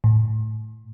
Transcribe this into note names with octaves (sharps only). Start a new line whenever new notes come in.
A2